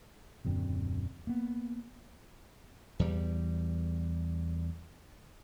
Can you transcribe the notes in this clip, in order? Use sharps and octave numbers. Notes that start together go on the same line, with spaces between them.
D#1 F#2 D3 C4
A#3 B3
E2 G3